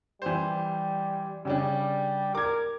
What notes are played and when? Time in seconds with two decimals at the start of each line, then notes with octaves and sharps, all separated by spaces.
0.22 E3 G3 C5
1.45 C#3 G3 C#4 D4
2.35 A#4 D6 G#6